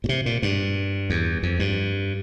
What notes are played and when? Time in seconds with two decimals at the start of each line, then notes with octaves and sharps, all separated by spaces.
0.04 A#2
0.09 C3
0.26 A#2
0.43 G2
1.10 E2
1.43 F2
1.59 G2